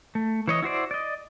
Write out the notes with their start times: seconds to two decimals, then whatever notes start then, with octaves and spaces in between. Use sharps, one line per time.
0.15 A3
0.48 E3 C#5 D#5
0.63 E4 F#4 C5 D5
0.91 D5 D#5